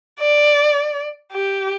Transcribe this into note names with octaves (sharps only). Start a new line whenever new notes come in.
D5
G4